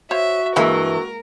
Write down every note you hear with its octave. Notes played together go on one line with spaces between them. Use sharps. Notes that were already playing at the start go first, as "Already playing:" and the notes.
F#4 C5 C#5 E5 F5
G2 E3 G#3 A#3 E4 A#4